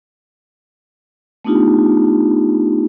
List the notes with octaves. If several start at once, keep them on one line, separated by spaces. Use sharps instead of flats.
A3 B3 D4 D#4 F4 G4